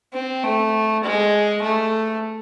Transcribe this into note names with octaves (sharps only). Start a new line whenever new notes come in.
C4
A3
G#3
A3